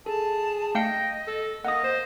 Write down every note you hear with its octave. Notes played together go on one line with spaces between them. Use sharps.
G#4 A4 A5
A3 D#5 F5 G5 C#7
A4
A#3 D#5 F#5 D#6
C5